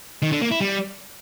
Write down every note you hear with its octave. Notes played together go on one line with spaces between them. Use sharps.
D#3
D3
A#3
E4
G3